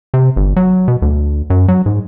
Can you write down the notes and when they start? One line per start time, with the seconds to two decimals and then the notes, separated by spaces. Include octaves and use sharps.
0.14 C3
0.36 G1
0.56 F#3
0.88 B2
1.02 D2
1.50 F#2
1.68 F#3
1.86 G#2